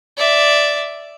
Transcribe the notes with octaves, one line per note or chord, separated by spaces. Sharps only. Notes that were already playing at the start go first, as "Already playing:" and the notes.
D5 E5